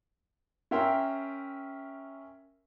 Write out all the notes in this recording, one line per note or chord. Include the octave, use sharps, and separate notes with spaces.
C#4 A#4 E5 G5 C6